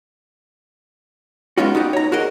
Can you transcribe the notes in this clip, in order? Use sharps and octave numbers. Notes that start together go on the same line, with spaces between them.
G#3 B3 C#4 D#4 F4 F#4
D#4 F#4 G4 D#5
C#5 A#5
F#4 G#4 A#4 D#5